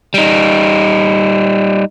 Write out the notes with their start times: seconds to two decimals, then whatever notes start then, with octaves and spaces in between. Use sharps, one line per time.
0.14 G3 D#4